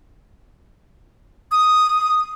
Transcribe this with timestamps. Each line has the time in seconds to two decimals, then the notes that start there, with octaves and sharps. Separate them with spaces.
1.51 D#6